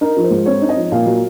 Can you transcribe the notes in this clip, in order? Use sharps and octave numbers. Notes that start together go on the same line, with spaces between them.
D#4 A#4
F3
C5
G#2
C4 C#5
D#4
D#5
F3
A#2 F5
F#3